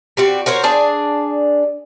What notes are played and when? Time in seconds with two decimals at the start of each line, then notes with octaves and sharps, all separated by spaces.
0.17 G3 C4 F#4
0.46 F#4 A#4 C5 C#5
0.63 D4 G#4 D5